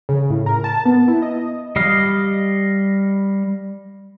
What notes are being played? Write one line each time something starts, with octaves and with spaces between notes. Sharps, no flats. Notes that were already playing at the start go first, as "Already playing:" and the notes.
C#3
A2
A#4
A5
B3
E4
D#5
G3 D#5 F5